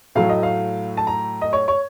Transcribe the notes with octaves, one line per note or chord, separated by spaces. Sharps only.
A2 F#3 A3 F5
D#5
F5
A5
A#5
D#5
C#5
C#5